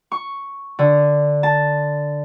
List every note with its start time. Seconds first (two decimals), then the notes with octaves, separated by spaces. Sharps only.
0.12 C#6
0.79 D3
1.43 A5